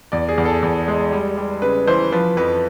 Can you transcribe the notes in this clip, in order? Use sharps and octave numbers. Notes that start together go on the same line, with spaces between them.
E2 D5
G#4
E2
A4
E2
G#3
G3
G3
C#3 B4
E3 C5
F3 B4
F2 B4